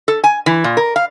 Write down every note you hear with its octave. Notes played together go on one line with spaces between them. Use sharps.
A4
G#5
E3
A#2
A#4
F5